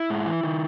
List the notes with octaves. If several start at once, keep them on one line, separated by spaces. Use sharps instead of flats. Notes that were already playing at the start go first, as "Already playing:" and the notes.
Already playing: E4
G#2
E3
D#3